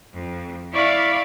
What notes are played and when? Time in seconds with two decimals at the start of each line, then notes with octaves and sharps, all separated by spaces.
0.13 F2
0.72 E4 D5 F5 B5 C#6